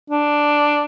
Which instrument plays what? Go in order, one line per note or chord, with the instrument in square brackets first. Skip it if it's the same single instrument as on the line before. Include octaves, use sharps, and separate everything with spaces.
[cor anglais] D4